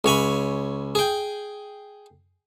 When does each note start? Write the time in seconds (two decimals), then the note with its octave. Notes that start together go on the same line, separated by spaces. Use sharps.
0.04 C#2 C#5 G#5 B5
0.95 G#4 G5